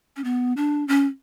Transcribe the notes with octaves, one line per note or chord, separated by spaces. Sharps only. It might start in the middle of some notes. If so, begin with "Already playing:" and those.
C#4
B3
D4
C#4